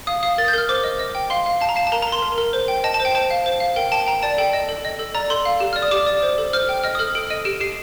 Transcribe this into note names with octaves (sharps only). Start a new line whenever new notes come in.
F5 D#6
F5 D#6
A#4 A6
G6
A#4 F6
C5 D6
D#5
D#5
G5
F5 C6
F5
F5 A5
A#5
F5 A5
A5
A#4 A#5
A#5
A#4
C6
A#4
A#4
C5
G5
D#5 A5
A5
C5
G5
C5 A5
F5
C5
F5
A#4 G5
G5 A5
G5 A#5
D5 A5
A4 G5
D#5
A4
D#5
A4
D5 A#5
A4 C6
F5
G4
D5 F6
D#6
G4 D6
D5
C5
A4
C5 F6
G5
D#5 F6
D#6
A4 F6
A4 D7
D#5 D#7
G4 D7
G4 C7